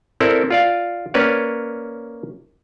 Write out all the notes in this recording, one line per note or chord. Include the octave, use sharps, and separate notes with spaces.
C4 E4 A4 A#4 D5
F4 D5 F5
A#3 C#4 B4 C#5 D5